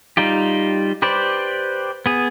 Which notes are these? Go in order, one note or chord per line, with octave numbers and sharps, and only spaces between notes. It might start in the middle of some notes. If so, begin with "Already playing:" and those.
G3 D#4 F4 G4
G4 B4 C5 D5
B3 G#4